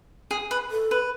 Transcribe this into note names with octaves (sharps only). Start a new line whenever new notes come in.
G#4
B4
A4
B4